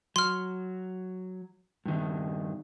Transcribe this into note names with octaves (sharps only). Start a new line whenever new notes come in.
F#3 C6 F6
G2 D#3